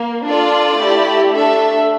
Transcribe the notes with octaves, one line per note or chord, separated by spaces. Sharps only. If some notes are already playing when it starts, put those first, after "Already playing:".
Already playing: A#3
D4 F4 A4 D5
A3 E4 G4
A3 D4 A4 E5